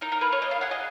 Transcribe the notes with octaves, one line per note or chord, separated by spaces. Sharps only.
D#4 A#4
A#4
A#3 B4
C#5
A#3 D#5
F5
G#4 F#5
D#5